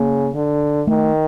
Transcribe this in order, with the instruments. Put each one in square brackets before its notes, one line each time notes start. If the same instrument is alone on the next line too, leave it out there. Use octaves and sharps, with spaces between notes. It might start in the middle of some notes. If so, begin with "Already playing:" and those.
Already playing: [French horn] C#3 [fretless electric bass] A#3
[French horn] D3
[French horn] D#3 [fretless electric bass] A3